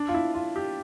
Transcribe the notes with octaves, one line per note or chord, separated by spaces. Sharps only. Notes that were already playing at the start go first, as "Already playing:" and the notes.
Already playing: D4
F4
E4
F4
G4